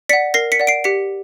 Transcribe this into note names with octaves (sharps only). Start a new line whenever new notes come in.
D5 F#5 B6 C#7
A#4 A#6 C7
B6 C#7
D5 F#5
C7 D7
G4 B6 C#7